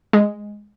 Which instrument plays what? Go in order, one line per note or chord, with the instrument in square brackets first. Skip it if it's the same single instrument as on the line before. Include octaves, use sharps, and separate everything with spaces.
[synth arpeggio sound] G#3